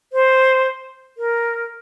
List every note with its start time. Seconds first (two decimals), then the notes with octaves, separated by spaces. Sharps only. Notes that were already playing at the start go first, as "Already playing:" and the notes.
0.13 C5
1.18 A#4